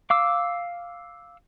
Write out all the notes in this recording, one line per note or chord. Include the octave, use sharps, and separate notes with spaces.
F5 D6 E6